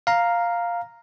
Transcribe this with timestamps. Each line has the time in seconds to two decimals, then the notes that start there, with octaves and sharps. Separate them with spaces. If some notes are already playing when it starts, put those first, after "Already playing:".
0.07 F5 A#5